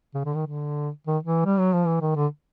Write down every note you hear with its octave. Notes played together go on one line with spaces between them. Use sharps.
C#3
D3
D#3
D3
D#3
E3
G3
F#3
F3
E3
D#3
D3